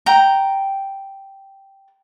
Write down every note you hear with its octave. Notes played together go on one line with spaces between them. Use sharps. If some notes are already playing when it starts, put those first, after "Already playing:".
G5 A#5